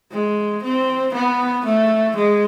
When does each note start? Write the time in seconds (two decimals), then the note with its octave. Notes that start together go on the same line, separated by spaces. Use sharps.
0.11 G#3
0.63 C4
1.14 B3
1.65 A3
2.16 G#3